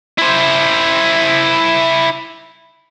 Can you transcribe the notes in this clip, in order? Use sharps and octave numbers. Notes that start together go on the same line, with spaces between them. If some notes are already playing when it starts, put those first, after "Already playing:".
E4 C5